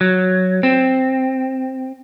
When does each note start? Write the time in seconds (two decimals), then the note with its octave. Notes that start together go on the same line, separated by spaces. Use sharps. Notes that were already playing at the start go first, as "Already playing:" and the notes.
0.01 F#3
0.63 C4